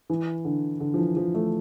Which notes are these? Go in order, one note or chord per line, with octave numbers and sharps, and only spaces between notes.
E3
D3
D3
F3
E3
F3
A3